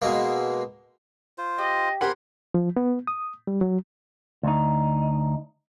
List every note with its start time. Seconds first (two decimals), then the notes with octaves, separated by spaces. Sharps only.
0.02 B2 G#3 A#3
1.38 F4 C5
1.58 G4 D#5
2.01 G4 A#4 C5 F#5 G#5 B5 C6
2.54 F3
2.77 B3
3.07 D#6
3.47 G3
3.61 F#3
4.43 D2 D#4